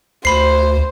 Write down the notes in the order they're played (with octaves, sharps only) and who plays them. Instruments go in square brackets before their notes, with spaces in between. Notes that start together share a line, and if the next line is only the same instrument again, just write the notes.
[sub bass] D2 [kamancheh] C5 [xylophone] B5 C7